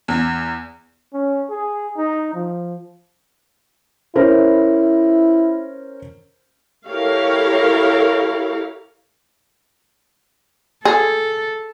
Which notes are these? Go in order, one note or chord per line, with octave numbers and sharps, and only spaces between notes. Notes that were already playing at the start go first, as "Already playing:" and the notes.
E2
C#4
G#4
D#4
F3
C#4 E4 A#4 C5
E4 G4 A4 A#4 C#5 F5
G#4 A4